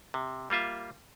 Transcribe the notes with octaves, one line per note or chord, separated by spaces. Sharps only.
C3
G3 A#3 F4 E5